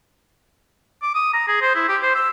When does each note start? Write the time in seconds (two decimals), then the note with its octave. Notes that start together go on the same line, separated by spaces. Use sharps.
1.02 D6
1.15 D#6
1.33 A#5
1.48 G#4
1.61 C5
1.75 E4
1.89 G4
2.02 C5
2.15 E6